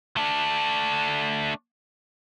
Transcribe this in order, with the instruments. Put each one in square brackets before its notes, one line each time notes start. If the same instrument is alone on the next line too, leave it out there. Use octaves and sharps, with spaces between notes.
[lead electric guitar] A3 D4